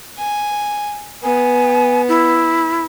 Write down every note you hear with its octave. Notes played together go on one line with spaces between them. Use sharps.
G#5
B3 G#5
E4